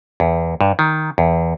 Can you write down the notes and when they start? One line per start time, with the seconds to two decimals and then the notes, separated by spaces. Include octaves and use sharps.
0.20 E2
0.61 G2
0.79 D#3
1.18 E2